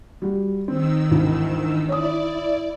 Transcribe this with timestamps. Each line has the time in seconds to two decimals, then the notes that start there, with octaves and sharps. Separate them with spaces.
0.22 G3 F#4
0.68 D#3 C4 E6
1.11 G#1 D2 E3
1.89 E4 C#5 D5 D#6